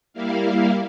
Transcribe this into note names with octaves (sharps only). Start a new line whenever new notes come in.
G3 A#3 E4 F5